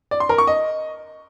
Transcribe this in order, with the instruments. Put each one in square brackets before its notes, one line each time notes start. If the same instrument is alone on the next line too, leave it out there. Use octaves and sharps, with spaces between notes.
[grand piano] D5
C6
A#4
C#6
D#5